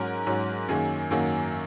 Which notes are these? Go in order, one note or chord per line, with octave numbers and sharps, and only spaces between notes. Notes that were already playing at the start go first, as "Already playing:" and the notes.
Already playing: G#2 F#3 C#4 A#4
G#2 F#3 C#4
F#2 D#3 F#3 A#3 G#4
F#2 D#3 F#3 A#3